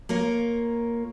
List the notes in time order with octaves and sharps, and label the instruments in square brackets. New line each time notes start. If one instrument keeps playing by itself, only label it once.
[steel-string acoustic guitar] A#3 F4 A#4 C#5